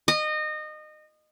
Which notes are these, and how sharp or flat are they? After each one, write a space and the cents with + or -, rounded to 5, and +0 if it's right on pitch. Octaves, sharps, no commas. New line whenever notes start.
D#5 -25